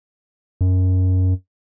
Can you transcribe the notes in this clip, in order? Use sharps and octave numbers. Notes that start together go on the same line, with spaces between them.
F#2